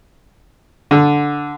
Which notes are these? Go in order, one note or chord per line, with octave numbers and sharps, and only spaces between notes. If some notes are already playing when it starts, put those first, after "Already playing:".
D3